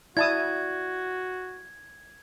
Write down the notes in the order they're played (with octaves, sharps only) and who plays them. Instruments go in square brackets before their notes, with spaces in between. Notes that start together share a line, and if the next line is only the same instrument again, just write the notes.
[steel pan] E4 A5 D#6 [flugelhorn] F#4 [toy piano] D5 [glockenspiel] G#6